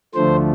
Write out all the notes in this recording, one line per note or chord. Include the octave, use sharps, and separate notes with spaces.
D2 D3 F3 A3 C5